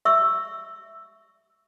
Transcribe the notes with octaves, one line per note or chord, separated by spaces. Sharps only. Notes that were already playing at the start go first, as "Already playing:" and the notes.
E5 C#6 E6